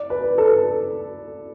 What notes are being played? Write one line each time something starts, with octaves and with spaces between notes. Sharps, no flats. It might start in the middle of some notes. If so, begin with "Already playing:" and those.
Already playing: D5
B4
A4